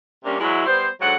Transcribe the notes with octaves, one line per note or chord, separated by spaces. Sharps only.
C3 G3 A#3 C#4 D4
E2 F#3 G#3 E4
G3 B3 C5
G#2 D3 F#3 F#5